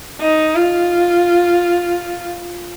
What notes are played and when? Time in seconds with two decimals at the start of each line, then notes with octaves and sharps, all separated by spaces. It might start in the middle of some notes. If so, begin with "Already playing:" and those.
0.21 D#4
0.55 F4